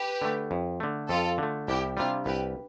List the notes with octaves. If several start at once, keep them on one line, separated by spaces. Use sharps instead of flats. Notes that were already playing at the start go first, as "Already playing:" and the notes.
Already playing: G4 B4
D3 A3
F2
D3 A3
F2 F4 A4
D3 A3
C2 E4 G4
C3 G3 D4 F4
C2 G4 B4